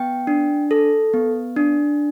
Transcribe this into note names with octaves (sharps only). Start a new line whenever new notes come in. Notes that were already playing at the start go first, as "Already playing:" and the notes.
Already playing: B3 G5
D4
A4
B3
D4